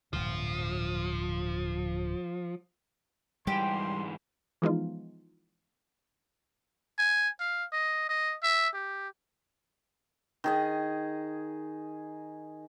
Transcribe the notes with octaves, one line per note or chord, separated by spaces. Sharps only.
D1 G2 A#2 F3
G#2 E3 G3 G4 C6
E3 F3 G#3 B3 D#4 F4
G#5
F5
D#5
D#5
E5
G4
D#3 G#4 D#5